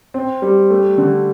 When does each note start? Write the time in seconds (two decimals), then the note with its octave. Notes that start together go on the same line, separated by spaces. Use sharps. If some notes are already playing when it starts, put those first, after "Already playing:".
0.14 C4
0.42 G3
0.70 A3
0.98 D3